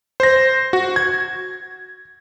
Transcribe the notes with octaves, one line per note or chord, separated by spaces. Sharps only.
C5 A#6
F#4
G#6